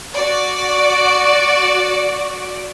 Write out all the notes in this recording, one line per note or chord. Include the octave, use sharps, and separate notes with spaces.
F#4 D5